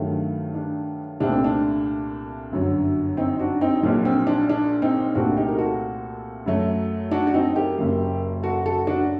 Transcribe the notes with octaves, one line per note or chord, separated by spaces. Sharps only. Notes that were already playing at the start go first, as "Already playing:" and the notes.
Already playing: G2 D#3 F#3 A3
D4
C2 A#2 A3 C4 D4
C4
D4
G1 F#2 D3 F#3
C4 D#4
D4 F#4
C4 D#4
A#1 A#2 F#3 D4
C4
D4
D4
C4 D#4
C2 A#2 A3 C4 D4 F#4
D#4 G4
A#4
F#4 A4
F#2 F#3 A3
D4 F#4
F#4
C4 D#4
G4 A#4
F#1 F#2 F#3 A#3
F#4 A4
F#4 A4
D4 F#4